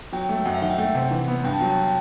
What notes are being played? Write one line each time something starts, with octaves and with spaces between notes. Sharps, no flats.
F#3 G5
A3
F#2 F#5
E5
D#3 F#5
G5
A3 F#5
C3
E3
B3
G2 G5
A5
F#3 G5
A5
G5